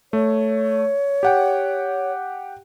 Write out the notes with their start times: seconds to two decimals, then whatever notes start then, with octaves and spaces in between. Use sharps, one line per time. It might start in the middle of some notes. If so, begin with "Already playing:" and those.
0.13 A3 C#5
1.23 G4 F#5 G5